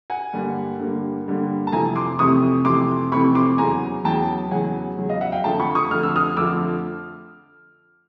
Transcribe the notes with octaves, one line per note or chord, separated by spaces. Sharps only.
F#5 G#5
G2 D3 G3 A#3
G2 D3 G3 A#3
G2 D3 G3 A#3
A5
F2 C3 E3 A3 C4 G#5 A#5
C6 D6
F2 C3 E3 A3 C4 C#6 D#6
F2 C3 E3 A3 C4 C6 D6
F2 C3 E3 A3 C4 B5 C#6
C6 D6
E2 C#3 F#3 G#5 A#5
E2 C#3 F#3 G5 A5
E2 C#3 F#3 F#5 G#5
E2 C#3 F#3
D#5 F5
E5 F#5
F5 G5
F2 D3 F3 A3 G5 A5
B5 C#6
C#6 D#6
F2 D3 F3 A3 F6
E6
D#6 F6
F2 D3 F3 A3 D6 E6